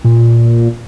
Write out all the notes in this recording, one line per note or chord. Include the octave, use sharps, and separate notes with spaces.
A#2